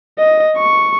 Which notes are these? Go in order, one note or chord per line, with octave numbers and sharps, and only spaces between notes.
D#5
C#6